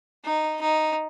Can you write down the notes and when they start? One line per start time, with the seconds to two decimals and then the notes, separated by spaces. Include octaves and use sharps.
0.25 D#4
0.61 D#4